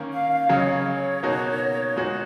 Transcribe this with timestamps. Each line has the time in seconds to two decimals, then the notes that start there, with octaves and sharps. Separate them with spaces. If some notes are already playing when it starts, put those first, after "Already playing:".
Already playing: D#3 A#3 C#4
0.12 F5
0.30 F5
0.49 C#3 F#3 C#4 C#5
0.56 D#5
0.65 C#5
1.23 B2 A#3 D#4 F#4
1.96 A#2 G#3 D#4 F#4